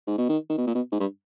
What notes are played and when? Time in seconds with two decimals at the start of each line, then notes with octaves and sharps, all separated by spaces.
0.07 G#2
0.18 B2
0.29 D#3
0.49 D#3
0.57 B2
0.67 A#2
0.75 B2
0.92 G#2
1.00 G2